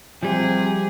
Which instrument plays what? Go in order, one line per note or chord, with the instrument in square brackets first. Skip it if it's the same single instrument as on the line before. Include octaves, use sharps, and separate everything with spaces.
[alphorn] C3 [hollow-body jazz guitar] F3 G3 [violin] G#4